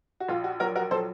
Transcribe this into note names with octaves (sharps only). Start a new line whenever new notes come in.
F#4
A#1 F4
F#4
F#3 F#4 A#4
F#4 A#4
F#3 A4 C5